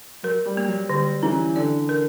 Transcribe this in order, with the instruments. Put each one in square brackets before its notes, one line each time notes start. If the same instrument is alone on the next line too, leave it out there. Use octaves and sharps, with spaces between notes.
[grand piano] F#3 [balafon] A#4
[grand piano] G3
[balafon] A#3
[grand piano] F#3
[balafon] D3 [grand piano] G3
[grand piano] E3 [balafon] C#4
[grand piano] D3 [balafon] D5
[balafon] A#4